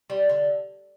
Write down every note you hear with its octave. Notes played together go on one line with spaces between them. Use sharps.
G3
D3